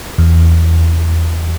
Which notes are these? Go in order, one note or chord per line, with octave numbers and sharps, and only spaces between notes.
E2